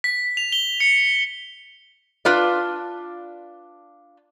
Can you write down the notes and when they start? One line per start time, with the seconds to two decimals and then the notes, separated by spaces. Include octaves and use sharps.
0.04 B6
0.37 F7
0.52 G7
0.80 C#7
2.25 D4 F4 B4 D5